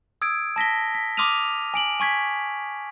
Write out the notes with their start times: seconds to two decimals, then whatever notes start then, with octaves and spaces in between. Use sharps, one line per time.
0.22 D#6 E6 G#6 D7
0.56 A5 A#6 B6 G7
0.95 B6
1.17 C6 D6 D#6 F6 D#7 F7
1.74 G#5 D7 F#7
2.00 G#5 C#6 G#6 B6